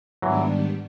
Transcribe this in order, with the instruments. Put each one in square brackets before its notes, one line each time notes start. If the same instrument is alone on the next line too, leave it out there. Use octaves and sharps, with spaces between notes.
[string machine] G#2 D#3 G3 B3 D4 [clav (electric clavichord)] E3 F#3